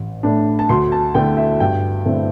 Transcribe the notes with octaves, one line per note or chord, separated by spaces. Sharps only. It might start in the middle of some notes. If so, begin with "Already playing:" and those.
Already playing: A1
A2 A3 D4
A5
D2 C6
A5
D3 A3 E4 G5
E5
G2 G5
D3 A3 C4 E4